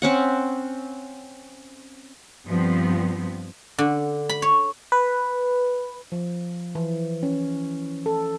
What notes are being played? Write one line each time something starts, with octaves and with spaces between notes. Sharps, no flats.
C4 C#4 F#5
G2 F3 B3 C4
D3
B5
C#5
B4
F3
E3
C#4
A4